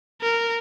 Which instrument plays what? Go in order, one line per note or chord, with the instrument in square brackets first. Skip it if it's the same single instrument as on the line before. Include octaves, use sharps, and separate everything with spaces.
[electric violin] A#4